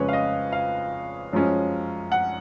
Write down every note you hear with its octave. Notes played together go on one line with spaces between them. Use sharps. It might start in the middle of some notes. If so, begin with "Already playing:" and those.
Already playing: F2 C#3 G#3 C#4 B4 C#5
F5
D#5
F5
F#2 F3 G#3 C#4
F#5